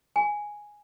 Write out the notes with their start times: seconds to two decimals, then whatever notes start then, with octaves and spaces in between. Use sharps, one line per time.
0.16 G#5